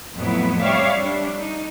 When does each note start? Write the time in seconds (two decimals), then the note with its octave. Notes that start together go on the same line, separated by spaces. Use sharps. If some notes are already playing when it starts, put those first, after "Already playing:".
0.15 F2 A2 F3 F#3 B3 E4
0.58 G3 C4 C#5 D5 E5 F5
0.99 G3 D4
1.37 D#4